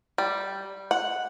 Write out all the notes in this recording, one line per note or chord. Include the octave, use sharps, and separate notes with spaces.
G3
F#5